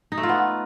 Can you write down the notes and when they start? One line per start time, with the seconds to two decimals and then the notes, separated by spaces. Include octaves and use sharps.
0.12 D#4
0.18 A3
0.23 F4
0.29 B3